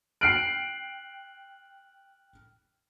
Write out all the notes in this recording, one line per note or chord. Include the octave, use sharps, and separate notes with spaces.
G5 F6 F#6 C7 D7 F#7